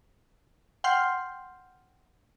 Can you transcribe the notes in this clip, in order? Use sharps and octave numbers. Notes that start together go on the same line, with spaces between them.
F#5 G5 C6 F6 G6 C7